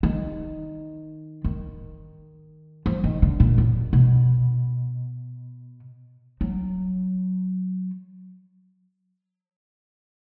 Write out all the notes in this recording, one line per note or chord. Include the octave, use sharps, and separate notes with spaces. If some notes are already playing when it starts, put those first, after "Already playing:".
D#3
D#3
F3
D#3
D3
A#2
F#2
B2
F#3